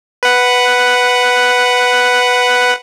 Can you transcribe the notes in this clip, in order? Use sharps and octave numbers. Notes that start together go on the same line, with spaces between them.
B4 F#5